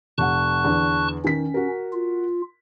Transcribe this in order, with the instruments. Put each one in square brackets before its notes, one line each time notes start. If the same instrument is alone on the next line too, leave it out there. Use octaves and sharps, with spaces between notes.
[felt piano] F1 F#5 [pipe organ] A5 C#6 F#6
[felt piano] E2 D3
[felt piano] D#3 B6 [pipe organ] C#4
[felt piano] F#4 A#4
[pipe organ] F4